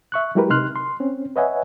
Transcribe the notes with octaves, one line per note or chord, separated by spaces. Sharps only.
E5 C#6 F#6
F#3 G#3 E4 G4 A#4 B4
C3 D#4 C6 F6 F#6
C6
C4 C#4
B4 C#5 D#5 E5 F#5 G#5